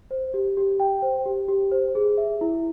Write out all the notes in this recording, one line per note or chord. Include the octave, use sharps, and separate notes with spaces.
C5
G4
G4
G5
C5
G4
G4
C5
G#4
E5
E4